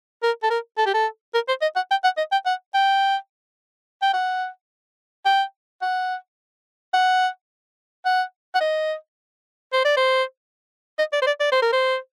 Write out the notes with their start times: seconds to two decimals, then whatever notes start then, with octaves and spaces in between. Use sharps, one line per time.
0.23 A#4
0.43 A4
0.50 A#4
0.78 A4
0.86 G4
0.94 A4
1.34 A#4
1.48 C5
1.62 D#5
1.76 F#5
1.91 G5
2.04 F#5
2.18 D#5
2.32 G5
2.46 F#5
2.74 G5
4.02 G5
4.14 F#5
5.26 G5
5.82 F#5
6.94 F#5
8.05 F#5
8.55 F#5
8.61 D#5
9.73 C5
9.85 D5
9.97 C5
10.99 D#5
11.13 D5
11.22 C5
11.27 D5
11.40 D5
11.52 C5
11.62 A#4
11.73 C5